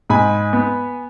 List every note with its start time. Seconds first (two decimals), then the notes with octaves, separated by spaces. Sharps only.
0.10 G#2 G#5 B5
0.53 B3